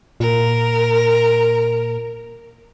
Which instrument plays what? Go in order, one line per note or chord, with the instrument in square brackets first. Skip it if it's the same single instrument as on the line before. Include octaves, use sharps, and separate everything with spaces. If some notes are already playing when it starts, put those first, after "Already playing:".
[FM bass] A#2 [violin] A#4